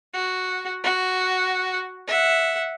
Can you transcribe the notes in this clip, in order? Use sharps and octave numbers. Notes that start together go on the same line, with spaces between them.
F#4
F#4
E5 F#5